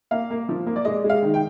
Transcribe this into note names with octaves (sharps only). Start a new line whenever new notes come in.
A#3 F5
A#3
F3
A#3
D5
G#3 D#5
G#3
F5
D#3
G5